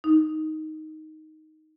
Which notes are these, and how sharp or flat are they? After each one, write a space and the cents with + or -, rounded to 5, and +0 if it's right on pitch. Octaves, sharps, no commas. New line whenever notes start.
D#4 +5